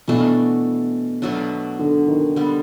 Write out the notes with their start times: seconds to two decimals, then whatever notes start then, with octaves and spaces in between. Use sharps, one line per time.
0.08 B2 E3 A3 D4 F#4
1.22 B2 F#3 A3 D4
1.79 D3
2.08 D#3
2.36 D3 G3 B3